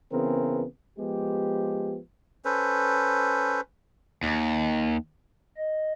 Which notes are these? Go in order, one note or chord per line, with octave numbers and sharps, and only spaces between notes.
C#3 E3 B3 C4 G#4 A#4
F3 G#3 B3 G4
C#4 A4 B4 C5
D#2
D#5